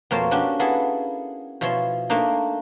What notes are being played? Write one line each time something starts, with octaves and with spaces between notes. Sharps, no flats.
F2 B2 A#3 C5 C#5 A5
C#4 D4 F#4 G4
A#3 B3 E4 G#4 A4
B2 F3 E4 C#5 C6
A3 A#3 D4 D#4